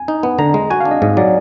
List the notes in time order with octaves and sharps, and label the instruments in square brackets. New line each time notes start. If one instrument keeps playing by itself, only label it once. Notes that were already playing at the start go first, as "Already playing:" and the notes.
Already playing: [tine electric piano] G#5
[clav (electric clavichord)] D#4
B3
[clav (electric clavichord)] D3 [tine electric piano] A#5
[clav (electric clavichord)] G#3
[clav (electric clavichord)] F#4 [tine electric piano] G#5
[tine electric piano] F5
[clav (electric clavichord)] D4
[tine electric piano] D#5
[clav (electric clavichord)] G#2 [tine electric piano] D#5
[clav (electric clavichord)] F#3 [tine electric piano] D5